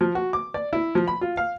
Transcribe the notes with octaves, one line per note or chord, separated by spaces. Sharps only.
F3
F#4
D6
D5
E4
F3
B5
F4
F5